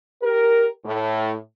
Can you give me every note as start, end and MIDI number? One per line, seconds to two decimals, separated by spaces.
0.22 0.64 67
0.22 0.64 70
0.84 1.34 45